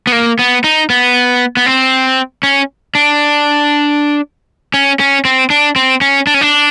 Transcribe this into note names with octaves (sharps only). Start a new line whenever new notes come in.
B3
A#3
B3
D#4
B3
B3
C4
C#4
D4
C#4
C#4
C4
D4
C4
C#4
D4
C#4
D4